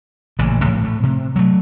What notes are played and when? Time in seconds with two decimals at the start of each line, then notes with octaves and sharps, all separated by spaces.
0.39 A1 A#2 C#3
0.63 D1 A2 F3
0.82 A2 A3
1.03 C3
1.36 F#3 A3